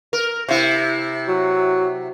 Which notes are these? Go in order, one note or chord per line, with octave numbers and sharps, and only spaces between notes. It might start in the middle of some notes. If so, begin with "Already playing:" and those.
A#4
C3 E4
F#3